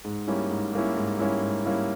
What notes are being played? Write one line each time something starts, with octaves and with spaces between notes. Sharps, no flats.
G#2
G3 A#3 C#4 E4
G#2
G3 A#3 C#4 E4
G#2
G3 A#3 C#4 E4
G#2
G3 A#3 C#4 E4